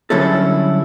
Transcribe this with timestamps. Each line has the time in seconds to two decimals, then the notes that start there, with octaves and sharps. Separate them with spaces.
0.10 D3 F#3 G3 C#4 E4 A4